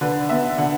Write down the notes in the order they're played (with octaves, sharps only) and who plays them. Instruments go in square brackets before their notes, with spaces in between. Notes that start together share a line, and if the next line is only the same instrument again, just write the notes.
[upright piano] D3 B4
B3 E5
D3 F#5